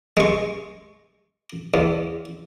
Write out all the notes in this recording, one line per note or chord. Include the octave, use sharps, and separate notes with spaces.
G#3 C#6
E2